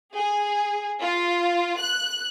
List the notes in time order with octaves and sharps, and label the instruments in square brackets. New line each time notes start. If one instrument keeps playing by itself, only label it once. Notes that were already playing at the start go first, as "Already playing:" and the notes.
[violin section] G#4
F4
F#6